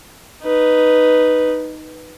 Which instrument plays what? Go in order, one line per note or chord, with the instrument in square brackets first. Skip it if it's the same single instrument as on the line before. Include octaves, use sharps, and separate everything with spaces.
[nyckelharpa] D#4 B4